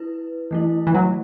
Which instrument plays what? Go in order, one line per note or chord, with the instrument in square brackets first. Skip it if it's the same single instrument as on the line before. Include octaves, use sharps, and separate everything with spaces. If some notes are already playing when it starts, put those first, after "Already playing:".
Already playing: [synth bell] E4 B4
E3 A3 E4
[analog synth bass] E3
F#3